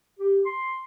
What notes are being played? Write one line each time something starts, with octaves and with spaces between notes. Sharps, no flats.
G4
C6